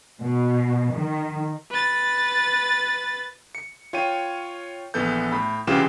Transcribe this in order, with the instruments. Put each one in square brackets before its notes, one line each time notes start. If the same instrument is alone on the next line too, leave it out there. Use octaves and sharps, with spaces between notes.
[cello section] B2
D#3
[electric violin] B4 A6
[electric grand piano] C#7
F4 C#5 G5 D#7
A#1 E3 B3 A4 G6
A2 B5
C2 C#3 E3 F4 G4 E7